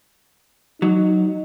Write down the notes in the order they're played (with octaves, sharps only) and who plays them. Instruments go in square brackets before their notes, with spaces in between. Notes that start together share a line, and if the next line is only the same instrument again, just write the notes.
[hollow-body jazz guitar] F#3 [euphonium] D#4